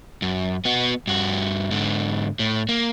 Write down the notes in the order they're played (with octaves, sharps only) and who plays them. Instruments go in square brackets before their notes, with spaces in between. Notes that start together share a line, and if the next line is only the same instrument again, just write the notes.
[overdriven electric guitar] F#2
B3 F#4
G2 F#4
G#2 D3
A2
A#3